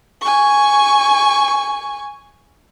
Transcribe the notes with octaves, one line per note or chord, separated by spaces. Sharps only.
G#5 C#6